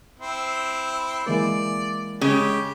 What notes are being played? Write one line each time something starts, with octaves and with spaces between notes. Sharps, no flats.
C4 E4
E3 G#3 A#3 D5
C#3 G#3 G4 D#6